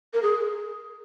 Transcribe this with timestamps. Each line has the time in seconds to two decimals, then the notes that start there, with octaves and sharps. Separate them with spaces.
0.14 A#4
0.23 G#4